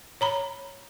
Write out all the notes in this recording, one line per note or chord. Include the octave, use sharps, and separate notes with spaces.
C#5 A#5 B5